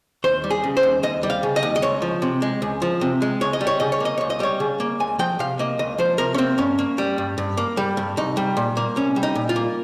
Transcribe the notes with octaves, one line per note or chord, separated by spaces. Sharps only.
D#2 C5
G3
G#4
C#3
C5
D#2
D#2 D#5
G3
F5
C#3
D#5
D#2
D#5
C#2 C#5
F3
C3
G#3
C#2
F3
C3
G#3
C#2 C#5
D#5
G3
C#5
C#3 D#5
C#5
A#3 D#5
C#2 C#5
D#5
G3 C#5
C#3
A#3
C#2 G#5
F3 G5
C3 F5
A#3 D#5
C#2 D#5
F3 C5
C3 A#4
C#4
A#3 C4
G2 C#4
A#3
G3
G2
G2
A#3
G3
G2
C2 D#4
G3
A#2
A#3
C2 C#4
G3
D#4
A#2
F4
A#3